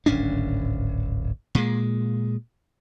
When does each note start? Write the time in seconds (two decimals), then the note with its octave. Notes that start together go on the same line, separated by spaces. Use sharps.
0.06 D1 G#1 C#4 D4
1.55 A#2 G#3